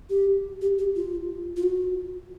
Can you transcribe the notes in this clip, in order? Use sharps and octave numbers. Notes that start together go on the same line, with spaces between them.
G4
G4
G4
F4
F4
F#4